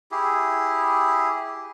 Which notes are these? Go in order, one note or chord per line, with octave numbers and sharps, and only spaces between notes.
E4 G4 G#4